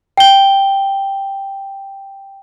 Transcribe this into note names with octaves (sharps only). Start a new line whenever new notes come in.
G5 G7